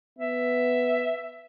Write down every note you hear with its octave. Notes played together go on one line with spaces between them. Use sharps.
B3 E5